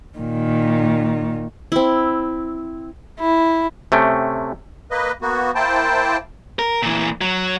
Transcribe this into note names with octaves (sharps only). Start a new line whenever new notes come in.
A#2 D#3
C4 E4
E4
C3 A3 C#4 G5
A#3 B4 D#5
A#3 B3 F#4
A#3 E4 C5 G5 A5
A#4
A#2 E3
F#3